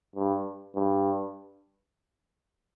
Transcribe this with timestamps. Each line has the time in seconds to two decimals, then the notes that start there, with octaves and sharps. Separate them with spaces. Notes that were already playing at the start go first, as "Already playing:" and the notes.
0.16 G2
0.75 G2